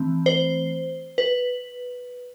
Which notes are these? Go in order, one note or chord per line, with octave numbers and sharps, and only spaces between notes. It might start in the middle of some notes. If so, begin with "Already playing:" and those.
Already playing: E3 A3 C4
C5
B4